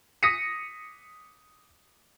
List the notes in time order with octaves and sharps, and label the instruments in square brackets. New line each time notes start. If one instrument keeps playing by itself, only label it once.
[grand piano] D#6 A#6 B6 C#7 D#7